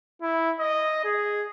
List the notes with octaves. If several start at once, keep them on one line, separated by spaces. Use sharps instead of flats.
E4
D#5
G#4